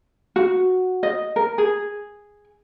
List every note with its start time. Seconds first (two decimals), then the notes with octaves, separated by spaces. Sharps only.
0.36 F#4
1.03 D#5
1.36 A#4
1.58 G#4